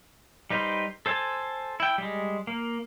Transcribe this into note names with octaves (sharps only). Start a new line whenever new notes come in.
G3 D#4 B4 C5
A4 C5 G#5 A5
E4 G5
G3 G#3
A#3